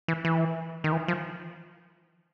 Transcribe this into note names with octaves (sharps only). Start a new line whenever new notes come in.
E3
E3
D#3
E3
F3